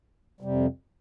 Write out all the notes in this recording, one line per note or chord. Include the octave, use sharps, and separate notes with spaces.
F2 C3 G3